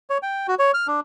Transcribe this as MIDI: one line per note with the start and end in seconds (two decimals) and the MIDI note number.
0.10 0.18 73
0.23 0.47 79
0.48 0.55 66
0.59 0.72 73
0.74 0.87 89
0.87 1.00 62